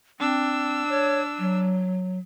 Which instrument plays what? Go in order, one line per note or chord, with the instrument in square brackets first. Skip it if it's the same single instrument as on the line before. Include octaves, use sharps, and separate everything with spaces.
[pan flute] C4 [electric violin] D4 E6
[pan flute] C#5
F#3